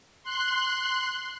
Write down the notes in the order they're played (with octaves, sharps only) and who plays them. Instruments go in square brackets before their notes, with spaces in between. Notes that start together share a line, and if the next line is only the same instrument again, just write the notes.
[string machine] C6 F#6